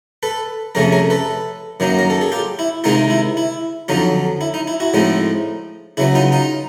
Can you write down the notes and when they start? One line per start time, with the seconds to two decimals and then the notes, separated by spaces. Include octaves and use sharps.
0.23 A4 B4
0.75 F2 C3 F3 A3 C#4 G#4 A#4
0.92 G#4 A#4
1.10 A4 B4
1.80 F#2 D#3 F#3 A#3 D#4
1.99 A#4
2.10 A4
2.21 G#4
2.32 F4 G4
2.59 E4
2.84 C3 D#3 G#3 C4 D#4 F4
3.10 E4
3.37 E4
3.88 F2 D3 F#3 D#4 F4
4.41 E4
4.54 D#4
4.67 E4
4.80 E4 F#4
4.94 A2 F3 G#3 C4 D#4
5.97 C#3 F#3 B3 E4
6.15 D#4 F4
6.32 D#4 F4